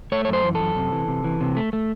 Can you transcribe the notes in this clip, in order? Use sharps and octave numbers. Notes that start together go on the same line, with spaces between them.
A3 C#5
C#5
F#2
C5
E3
F#2 A4
C3
E3
C3
E3
C3
A3
A3